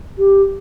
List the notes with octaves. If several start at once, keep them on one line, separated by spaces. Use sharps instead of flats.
G4